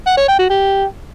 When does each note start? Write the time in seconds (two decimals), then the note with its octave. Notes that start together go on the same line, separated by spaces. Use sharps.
0.07 F#5
0.17 C#5
0.28 G5
0.39 F#4
0.50 G4